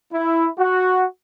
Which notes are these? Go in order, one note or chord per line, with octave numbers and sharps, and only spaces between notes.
E4
F#4